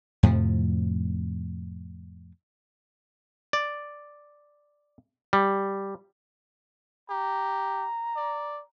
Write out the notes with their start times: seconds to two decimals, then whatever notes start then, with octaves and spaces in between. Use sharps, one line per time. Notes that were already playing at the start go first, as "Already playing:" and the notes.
0.23 F2 A2 C3 F3
3.53 D5
5.33 G3
7.10 G4 A#5
8.16 D5